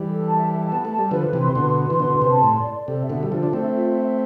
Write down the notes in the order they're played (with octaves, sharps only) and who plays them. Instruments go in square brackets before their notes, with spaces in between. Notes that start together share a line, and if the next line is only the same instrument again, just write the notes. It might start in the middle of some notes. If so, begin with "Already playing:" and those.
Already playing: [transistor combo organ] E3 G3
[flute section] A4
A5
E5
A4
[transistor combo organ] B3 [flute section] A5
[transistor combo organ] A3 [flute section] A5
[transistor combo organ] G3 [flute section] A4
[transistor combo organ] D3 F3 [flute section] B4
[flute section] B4
[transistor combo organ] C3 E3
[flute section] C6
[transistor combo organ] B2 D3 [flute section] B4
[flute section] B4
C6
[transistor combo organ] E3
[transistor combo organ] B2 D3 [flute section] B4
[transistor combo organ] D3 [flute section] C6
[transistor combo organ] C3
[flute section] A5
[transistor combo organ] A2 [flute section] C6
[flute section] D5
D5
[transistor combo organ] C3 [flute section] A4
[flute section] E5
[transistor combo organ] B2 D3
[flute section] A4
[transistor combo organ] G3
[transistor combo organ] D3 F3 [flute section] F4
[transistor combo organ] D4 [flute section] A4
[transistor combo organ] A3 C4
[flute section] E5
F4
E5
E5